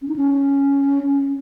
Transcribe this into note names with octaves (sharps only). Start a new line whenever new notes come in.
C#4
D#4
C#4
C#4